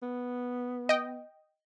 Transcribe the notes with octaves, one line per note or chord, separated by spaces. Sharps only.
B3
D#5 G5